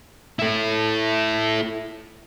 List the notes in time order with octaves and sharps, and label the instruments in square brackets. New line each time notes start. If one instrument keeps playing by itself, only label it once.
[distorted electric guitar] E4 A4